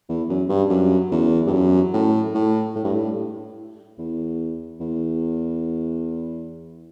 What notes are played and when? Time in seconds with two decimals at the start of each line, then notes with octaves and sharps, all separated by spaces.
0.09 E2
0.29 F#2
0.49 G2
0.69 F#2
1.11 E2
1.46 G2
1.52 F#2
1.93 A2
2.34 A2
2.75 A2
2.84 G2
2.94 A2
3.98 E2
4.80 E2